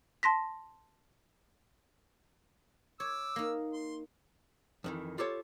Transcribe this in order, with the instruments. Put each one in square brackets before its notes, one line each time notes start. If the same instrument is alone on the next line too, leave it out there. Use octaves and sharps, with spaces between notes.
[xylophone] A5 C6 A#6 B6
[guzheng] C#5 [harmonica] D6 E6
[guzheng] A#3 D#4
[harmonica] C6
[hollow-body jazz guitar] F2 D#3 E3
F4 G4 A4 C#5